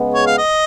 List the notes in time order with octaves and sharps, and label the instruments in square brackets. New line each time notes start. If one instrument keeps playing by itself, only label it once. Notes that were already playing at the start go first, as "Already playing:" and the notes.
Already playing: [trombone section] C#3 G#3 B3
[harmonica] C#5
F5
D#5